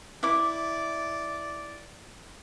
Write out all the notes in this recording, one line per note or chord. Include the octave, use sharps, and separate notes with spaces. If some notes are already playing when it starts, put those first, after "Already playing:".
E4 D5 D6